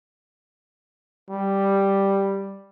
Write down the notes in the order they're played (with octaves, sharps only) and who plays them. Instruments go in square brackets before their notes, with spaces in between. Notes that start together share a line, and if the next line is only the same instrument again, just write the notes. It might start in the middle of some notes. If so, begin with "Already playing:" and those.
[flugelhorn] G3